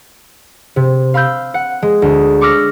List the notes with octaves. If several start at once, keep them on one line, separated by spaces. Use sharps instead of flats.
C3
F5 B5 E6 G6
F#5
G#3
D2
C#6 D6 E6 F6 A#6